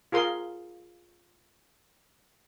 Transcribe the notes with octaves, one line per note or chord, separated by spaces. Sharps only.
F4 G#4 A#4 C6